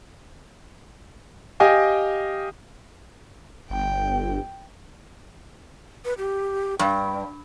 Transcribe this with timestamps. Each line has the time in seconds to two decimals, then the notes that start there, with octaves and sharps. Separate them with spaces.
1.60 G4 D#5 F5 G5 G#5
3.70 G1 G5
6.05 B4
6.18 G4
6.79 G2 G5